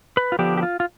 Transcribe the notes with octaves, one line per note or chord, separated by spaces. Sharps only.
B4
F4
D3 F3 B3 D4 G4
G4
F4
F4